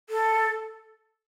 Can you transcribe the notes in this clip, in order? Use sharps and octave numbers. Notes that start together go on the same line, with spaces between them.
A4